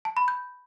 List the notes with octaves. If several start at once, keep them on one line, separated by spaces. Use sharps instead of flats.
A5
B5
G6